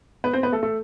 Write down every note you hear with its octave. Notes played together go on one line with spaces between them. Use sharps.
B3 B4
C4 C5
B3 B4
A3 A4
A3 A4